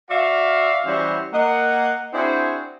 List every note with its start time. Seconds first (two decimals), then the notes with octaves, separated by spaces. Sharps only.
0.10 F#4 D5 E5 F5
0.87 E3 G3 C#4 E4 F#4 C5
1.33 A#3 D#5 F#5
2.14 C4 D4 E4 F#4 G#4 C5